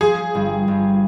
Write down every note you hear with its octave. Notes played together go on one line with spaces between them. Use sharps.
F3 G#4
G1
G1